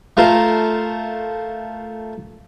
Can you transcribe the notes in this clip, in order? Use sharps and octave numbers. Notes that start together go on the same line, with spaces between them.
A3 F4 A#4 C5